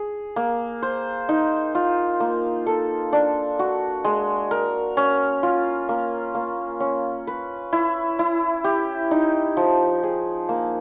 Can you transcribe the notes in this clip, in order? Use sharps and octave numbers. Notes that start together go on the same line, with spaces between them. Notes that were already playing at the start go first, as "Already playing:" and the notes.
Already playing: G#4
A#3
C5
D#4
F4
A#3
A4
D4
F#4
G#3
A#4
C#4
F4
A#3
A#3
C#4
B4
E4
E4
G4
D#4
F3
G#4
A#3